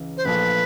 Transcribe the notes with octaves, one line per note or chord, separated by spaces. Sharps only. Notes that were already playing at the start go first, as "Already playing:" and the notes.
Already playing: C#2 C#3 E3
C5
A#1 A#2 F3 A3 B4